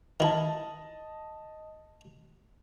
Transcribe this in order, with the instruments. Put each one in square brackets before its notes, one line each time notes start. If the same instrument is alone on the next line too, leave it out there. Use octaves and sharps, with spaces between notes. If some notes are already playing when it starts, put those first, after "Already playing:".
[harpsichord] D#3 E4 [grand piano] D#5 A5